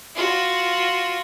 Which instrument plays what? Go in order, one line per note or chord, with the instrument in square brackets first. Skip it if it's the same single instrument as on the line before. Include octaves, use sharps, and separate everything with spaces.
[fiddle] F4 F#4